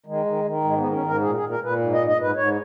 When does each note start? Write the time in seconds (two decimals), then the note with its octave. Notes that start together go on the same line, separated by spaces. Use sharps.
0.06 D#3 G#3
0.25 D#3
0.44 D#3
0.64 G#2 G#3
0.77 D#3 B3
0.92 C#4
1.02 G#2 A#4
1.21 A#2 G#4
1.35 A#2 G#4
1.49 A#4
1.59 A#2 B4
1.79 G#2
1.93 G#2 D#5
2.07 D#5
2.16 G#2 B4
2.36 G#2 C#5